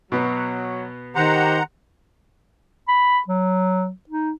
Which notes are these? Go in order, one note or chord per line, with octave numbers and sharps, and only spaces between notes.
B2 F#3 B3
D#3 G4 C5 F#5 A#5
B5
F#3
D#4